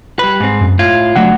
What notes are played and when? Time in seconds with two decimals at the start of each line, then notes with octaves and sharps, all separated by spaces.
0.19 G3 B4
0.40 G#2 C4
0.61 F#2
0.79 A2 F4 G#6
1.16 D3 F#3 A3 F#5